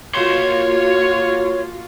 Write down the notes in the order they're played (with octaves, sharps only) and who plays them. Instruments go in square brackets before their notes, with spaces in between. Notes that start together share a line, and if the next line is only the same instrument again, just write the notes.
[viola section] A#3 F4 F#4 [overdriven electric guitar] C#5 C6